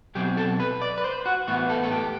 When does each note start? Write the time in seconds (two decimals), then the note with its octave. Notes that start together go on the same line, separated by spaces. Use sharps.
0.15 B2 F#3 C4 G4
0.37 A4
0.60 B4
0.82 D5
0.98 B4
1.04 C5
1.26 F#4
1.48 A2 E3 B3 F#4
1.70 A4
1.84 A4
1.92 G4